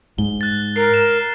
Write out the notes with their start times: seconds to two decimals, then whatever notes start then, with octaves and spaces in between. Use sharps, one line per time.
0.18 G#2 G7
0.41 F#6 A6
0.76 A#4 C7
0.94 E7